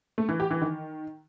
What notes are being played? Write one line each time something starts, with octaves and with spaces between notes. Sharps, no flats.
A3
E3
G4
E3
D#3